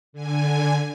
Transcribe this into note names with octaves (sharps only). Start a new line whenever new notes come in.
D3 G#5